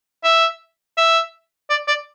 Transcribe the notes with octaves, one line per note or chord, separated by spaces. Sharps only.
E5
E5
D5
D5